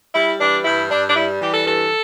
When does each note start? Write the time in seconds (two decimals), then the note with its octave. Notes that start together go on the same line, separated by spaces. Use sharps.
0.15 G3 E4
0.40 E3 D4
0.65 G2 E4
0.90 G2 D4
1.07 D4
1.16 G3 E4
1.41 E3 G4
1.53 A4
1.66 G2 A4